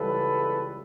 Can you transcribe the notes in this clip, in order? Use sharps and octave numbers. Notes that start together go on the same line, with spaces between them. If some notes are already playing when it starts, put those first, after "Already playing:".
Already playing: C#2 C#3 E3 G3 A4 B4